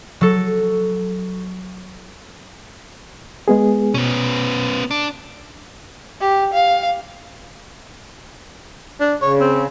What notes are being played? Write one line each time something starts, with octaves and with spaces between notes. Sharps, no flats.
F#3 A4
G#3 B3 G#4
B2 B3 C#4
D4
G4
F5
D4
C#3 C#5
C4